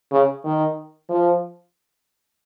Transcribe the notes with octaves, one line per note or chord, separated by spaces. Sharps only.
C#3
D#3
F3